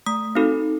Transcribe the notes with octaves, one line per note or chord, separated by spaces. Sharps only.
A3 D#6
C4 D#4 F#4 A4